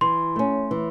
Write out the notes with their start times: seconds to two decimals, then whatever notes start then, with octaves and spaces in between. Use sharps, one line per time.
0.01 E3 C6
0.36 A3 C#4
0.71 E3